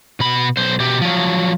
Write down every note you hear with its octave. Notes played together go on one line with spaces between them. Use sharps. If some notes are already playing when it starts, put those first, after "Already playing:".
B2 B5
B1 C5
B2 G4
F3 F#3